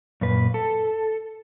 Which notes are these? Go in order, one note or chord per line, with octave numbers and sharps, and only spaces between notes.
F#2 A#2 B4
A4